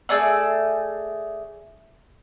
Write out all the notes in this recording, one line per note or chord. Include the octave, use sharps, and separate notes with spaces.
A3 G#4 D5 E6